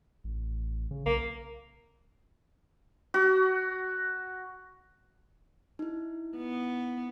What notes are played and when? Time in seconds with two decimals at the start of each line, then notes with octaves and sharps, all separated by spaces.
0.24 A1
0.91 C#3
1.06 B1 A#3
3.14 F#4
5.79 D#4 E4
6.37 B3